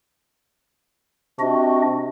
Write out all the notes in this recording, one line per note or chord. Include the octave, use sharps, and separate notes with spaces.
C3 D4 F#4 D#5